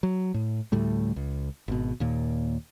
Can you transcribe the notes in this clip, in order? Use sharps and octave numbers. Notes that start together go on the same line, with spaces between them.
F#3
A2
D2 A2 G3 A3
C#2
G#1 B2
D#2 A#2